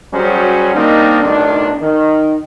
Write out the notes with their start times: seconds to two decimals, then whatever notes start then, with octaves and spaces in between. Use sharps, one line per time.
0.13 F#3 G3 C#4 F#4 G#4 C5
0.75 D#3 G3 A#3 C4 D4 D#4
1.22 B1 A2 D#3 D4
1.81 D#3